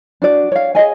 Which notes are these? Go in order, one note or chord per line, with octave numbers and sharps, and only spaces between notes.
D4 F#4 D5
C#5 F5
G#4 C#5 D#5 G#5